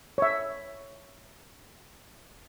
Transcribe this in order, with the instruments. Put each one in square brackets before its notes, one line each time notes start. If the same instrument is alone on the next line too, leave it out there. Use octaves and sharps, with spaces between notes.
[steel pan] C#5 E5